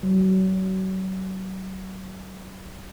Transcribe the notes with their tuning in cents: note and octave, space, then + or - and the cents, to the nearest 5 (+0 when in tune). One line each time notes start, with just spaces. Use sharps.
F#3 +35